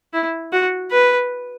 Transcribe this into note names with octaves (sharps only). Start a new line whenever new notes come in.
E4
F#4
B4